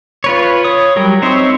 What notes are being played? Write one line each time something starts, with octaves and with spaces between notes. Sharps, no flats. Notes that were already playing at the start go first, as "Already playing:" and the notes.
F4 B4 C#5
C#5 D#6
F#3 G3 A#4
C4 D#4 C5 C#5 E5